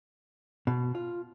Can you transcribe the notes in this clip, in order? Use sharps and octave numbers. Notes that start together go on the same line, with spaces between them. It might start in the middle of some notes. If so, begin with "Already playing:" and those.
B2
F4